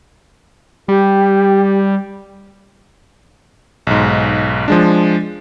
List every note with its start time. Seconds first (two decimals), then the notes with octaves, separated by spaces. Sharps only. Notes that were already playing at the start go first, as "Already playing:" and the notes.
0.88 G3 G4
3.87 B1 G#2
4.68 F3 G#3 D4